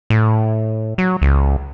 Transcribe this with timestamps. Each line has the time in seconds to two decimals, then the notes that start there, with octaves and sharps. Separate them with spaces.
0.10 A2
0.98 F#3
1.22 C#2